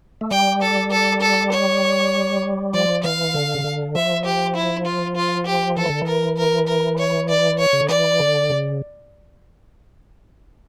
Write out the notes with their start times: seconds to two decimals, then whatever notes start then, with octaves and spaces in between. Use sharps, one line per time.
0.21 A3
0.31 G3 G5
0.62 A4
0.91 A4
1.21 A4
1.52 C#5
2.74 F3 D5
3.03 E3 F5
3.34 D3
3.55 C#3
3.64 D3
3.95 F3 E5
4.25 G4
4.56 E4
4.86 F4
5.16 F4
5.46 G4
5.77 E3 A4
5.90 D3
6.01 E3
6.07 A#4
6.37 A#4
6.67 A#4
6.99 C#5
7.29 D5
7.59 C#5
7.73 C#3
7.81 D3
7.89 E3 D5
8.20 D3
8.50 C#3